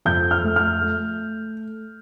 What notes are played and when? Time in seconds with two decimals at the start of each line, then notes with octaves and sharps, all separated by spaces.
0.05 F2 G6
0.31 F6
0.44 A3
0.56 F6
0.81 A3